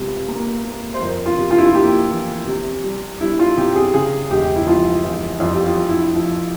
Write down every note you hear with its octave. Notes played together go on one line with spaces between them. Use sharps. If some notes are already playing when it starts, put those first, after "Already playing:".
Already playing: C#2 C3
A#3
A#3
C5
F2 A#4
F4
C3
F4
E4
F4
A#3 G4
E3
C3
G3
G3 E4
F4
C3 G4
G#4
C#3 G#4
E1 G4
E4
F3 F4
E2
F2 F4
G4
F4
F2
E4
F3